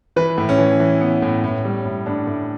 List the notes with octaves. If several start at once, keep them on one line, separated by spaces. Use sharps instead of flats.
E3 B4
A2
C#4
E3
E3
B3
A2
A2
G3
A2
A2 D4
A2